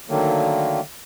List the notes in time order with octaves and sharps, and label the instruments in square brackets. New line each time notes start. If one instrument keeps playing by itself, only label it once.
[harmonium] D3 D#3 F#3 A3 A#3